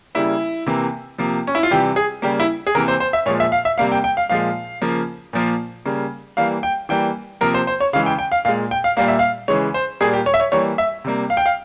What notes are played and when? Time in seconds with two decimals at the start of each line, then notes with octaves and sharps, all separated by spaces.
0.15 C#3 G3 A#3 E4
0.67 C3 E3 A#3
1.18 C3 F3 A#3
1.47 C#4
1.55 E4
1.63 F4
1.71 C3 E3 G3 G4
1.96 G#4
2.22 C#3 G3 A#3 G4
2.40 E4
2.67 G#4
2.75 C3 E3 A#3 A#4
2.88 C5
3.00 C5
3.13 E5
3.26 A#2 F3 G#3 C#5
3.40 E5
3.52 F5
3.65 E5
3.78 C3 G3 A#3 F5
3.92 G5
4.04 G5
4.17 F5
4.30 A#2 F3 G#3 F5
4.82 C#3 F3 A#3
5.33 A#2 F3 A#3
5.86 C#3 G3 A#3
6.37 E3 G3 A#3 F5
6.63 G5
6.89 E3 G3 A#3 G5
7.41 C3 F3 A#3 A#4
7.54 C5
7.67 C5
7.80 C#5
7.93 C#3 E3 G#3 F5
8.06 G5
8.19 G5
8.32 F5
8.45 A#2 G#3 F5
8.71 G5
8.84 F5
8.97 A#2 G3 A#3 F5
9.08 E5
9.19 F5
9.48 C#3 E3 G#3 C#5
9.74 C5
10.01 A#2 G3 A#3 G#4
10.13 G4
10.26 C#5
10.34 E5
10.40 C#5
10.52 E3 G3 A#3 C#5
10.78 E5
11.05 C3 G3 A#3
11.30 F5
11.37 G5
11.46 F5